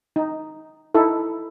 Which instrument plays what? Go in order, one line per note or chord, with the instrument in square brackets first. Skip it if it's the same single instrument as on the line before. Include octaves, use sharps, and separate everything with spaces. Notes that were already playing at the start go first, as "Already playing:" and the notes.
[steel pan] D#4
D#4 E4 A4